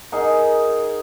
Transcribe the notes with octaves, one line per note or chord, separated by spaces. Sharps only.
D#4 G#4 A#4 F#5